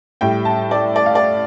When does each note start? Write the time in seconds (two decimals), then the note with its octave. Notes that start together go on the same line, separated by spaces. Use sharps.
0.21 A2 G3 G5
0.45 A5
0.71 D5
0.96 D5
1.06 F5
1.15 D5